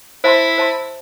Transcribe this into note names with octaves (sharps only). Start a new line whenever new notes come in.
E4 C5 E5 A5 C6
C5 E5 A5 C6